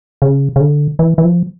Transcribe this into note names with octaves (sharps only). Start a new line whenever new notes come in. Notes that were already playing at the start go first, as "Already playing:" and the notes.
C#3
C#3
D3
E3
E3
F3